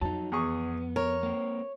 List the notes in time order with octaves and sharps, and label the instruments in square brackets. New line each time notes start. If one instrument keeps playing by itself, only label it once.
[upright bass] F2 [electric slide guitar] F#3 D#4 [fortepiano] A5
[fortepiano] E2 G#4 C#6 [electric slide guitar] B3
[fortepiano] A#4 [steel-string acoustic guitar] C#5
[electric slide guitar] A#3 C4